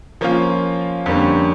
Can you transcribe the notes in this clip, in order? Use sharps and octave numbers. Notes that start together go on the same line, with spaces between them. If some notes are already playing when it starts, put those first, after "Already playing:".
F3 A#3 C#4 F4
F2 D3 G3 A#3 C#4